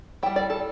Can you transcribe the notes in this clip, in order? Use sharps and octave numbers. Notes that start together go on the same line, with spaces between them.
G3 E4 G5
D5
A4